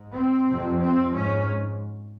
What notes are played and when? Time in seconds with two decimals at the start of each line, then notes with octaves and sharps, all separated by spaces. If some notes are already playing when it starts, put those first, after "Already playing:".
Already playing: G#2
0.13 C4
0.46 F2 C3
0.79 C4
1.12 G#2 C#4